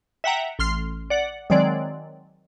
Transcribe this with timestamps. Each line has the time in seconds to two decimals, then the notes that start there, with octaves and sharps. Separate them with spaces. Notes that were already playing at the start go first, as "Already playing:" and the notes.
0.24 E5 F#5 G5 A#5
0.59 A1 C6 F6 C7
1.10 D5 F#5
1.50 D#3 F#3 G#3 C4 D5